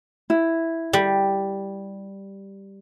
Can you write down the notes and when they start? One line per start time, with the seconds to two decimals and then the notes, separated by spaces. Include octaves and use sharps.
0.30 E4
0.93 G3